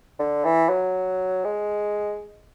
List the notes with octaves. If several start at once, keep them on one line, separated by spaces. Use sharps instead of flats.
D3
E3
F#3
G#3